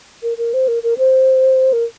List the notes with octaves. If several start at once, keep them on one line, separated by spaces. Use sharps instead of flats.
A#4
A#4
C5
A#4
A#4
C5
A#4